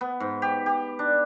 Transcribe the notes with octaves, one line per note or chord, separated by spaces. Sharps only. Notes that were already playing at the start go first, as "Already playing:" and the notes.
B3
G#2
G4
G4
D4